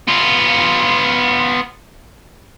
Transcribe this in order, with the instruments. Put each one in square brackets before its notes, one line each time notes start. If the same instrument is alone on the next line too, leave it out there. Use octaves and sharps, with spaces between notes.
[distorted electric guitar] B3 F4